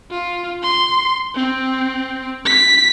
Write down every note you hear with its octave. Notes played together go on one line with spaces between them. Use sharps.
F4
C6
C4
B6